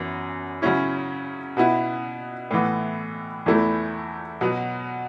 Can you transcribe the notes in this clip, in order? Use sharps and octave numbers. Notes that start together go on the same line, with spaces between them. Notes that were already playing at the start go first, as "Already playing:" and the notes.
Already playing: F#2 E3 B3
C#3 F#3 C#4 E4
B2 B3 E4
A2 E3 B3
E2 E3 A3 E4
B2 F#3 B3